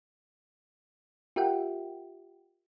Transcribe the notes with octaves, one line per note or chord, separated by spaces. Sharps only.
F4 G4 A#4 E5 F#5 G5